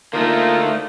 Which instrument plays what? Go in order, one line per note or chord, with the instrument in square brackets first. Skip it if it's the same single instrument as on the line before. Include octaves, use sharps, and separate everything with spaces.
[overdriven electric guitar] D2 A3 [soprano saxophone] A#3 [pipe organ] D#4 F4